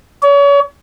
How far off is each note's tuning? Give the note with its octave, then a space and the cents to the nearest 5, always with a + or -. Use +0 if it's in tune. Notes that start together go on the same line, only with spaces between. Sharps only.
C#5 +35